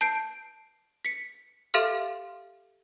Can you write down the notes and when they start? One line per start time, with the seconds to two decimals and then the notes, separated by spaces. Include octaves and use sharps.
0.01 A5 G6 C7 D7
1.05 B6 C#7
1.74 G4 A4 E5 F5 C6 F6